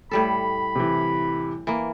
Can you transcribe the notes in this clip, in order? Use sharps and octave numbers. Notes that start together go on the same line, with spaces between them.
A2 G3 A4 B5
C3 E3
E3 A#3